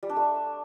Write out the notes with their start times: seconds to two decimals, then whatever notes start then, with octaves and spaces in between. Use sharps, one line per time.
0.03 G3
0.09 D4
0.16 A3